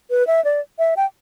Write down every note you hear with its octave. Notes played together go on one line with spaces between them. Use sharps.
B4
E5
D5
E5
G5